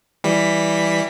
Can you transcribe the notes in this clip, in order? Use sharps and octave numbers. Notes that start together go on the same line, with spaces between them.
E3 G3 B6